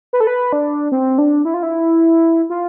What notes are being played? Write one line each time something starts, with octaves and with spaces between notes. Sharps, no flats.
B4
A4
B4
D4
C4
D4
E4
F4
E4
F4